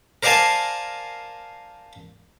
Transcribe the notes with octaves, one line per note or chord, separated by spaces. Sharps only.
A#4 C5 D5 F5 G#5 A5